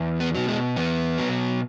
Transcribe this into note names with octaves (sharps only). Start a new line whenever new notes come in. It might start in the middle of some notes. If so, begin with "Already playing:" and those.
Already playing: E2
B3
B2 F#3
G#3
E2 B3
B2 F#3